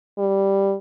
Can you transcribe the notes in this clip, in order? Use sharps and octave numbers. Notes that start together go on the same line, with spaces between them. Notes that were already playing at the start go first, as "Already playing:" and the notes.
G3